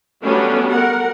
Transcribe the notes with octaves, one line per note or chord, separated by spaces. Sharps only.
F#3 G3 A3 B3 C#4 D4
A#4 F#5